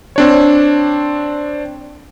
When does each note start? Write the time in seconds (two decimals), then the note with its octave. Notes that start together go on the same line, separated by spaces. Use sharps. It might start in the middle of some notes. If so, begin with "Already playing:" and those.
0.16 C4 D4 C#5